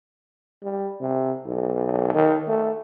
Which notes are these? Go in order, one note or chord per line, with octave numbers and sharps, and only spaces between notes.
G3
C3
B1
D#3
A3